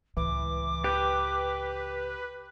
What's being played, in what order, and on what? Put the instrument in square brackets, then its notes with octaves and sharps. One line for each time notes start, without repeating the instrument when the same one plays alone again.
[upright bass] C#2 A2 [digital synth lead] E3 [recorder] D6
[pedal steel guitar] G4 [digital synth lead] B4